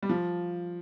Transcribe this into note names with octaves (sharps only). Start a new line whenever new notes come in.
G3
F3